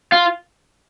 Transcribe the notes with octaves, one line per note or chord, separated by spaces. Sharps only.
F4